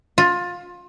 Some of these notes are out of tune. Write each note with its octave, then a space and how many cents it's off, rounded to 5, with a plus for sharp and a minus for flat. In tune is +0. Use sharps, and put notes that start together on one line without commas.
F4 +20